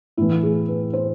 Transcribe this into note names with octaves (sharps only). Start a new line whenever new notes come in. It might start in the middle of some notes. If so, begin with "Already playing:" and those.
A2 E3 E4
G#4
B4
C5